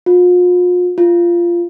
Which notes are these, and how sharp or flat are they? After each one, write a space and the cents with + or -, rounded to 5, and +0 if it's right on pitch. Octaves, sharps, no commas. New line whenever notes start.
F4 +40
F4 -15